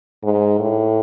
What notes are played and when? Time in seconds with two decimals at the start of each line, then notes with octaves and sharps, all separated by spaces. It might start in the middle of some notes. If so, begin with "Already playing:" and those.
0.24 G#2
0.59 A2